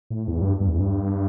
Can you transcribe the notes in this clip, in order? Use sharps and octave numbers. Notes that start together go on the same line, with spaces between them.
A2
E2
G2
G2
E2
G2